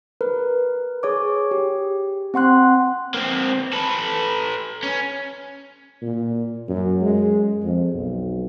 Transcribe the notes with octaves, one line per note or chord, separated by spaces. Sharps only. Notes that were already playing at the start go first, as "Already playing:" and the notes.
A#4 B4
G#4 C#5 D6
G4
C4 F#5 C6 F#6
A#3 C4
A4 B4
C#4
A#2
F#2
G#3
F2
B1